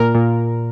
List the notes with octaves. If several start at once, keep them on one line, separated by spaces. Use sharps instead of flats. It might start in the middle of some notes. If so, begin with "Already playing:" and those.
Already playing: A#2 A#4
A#2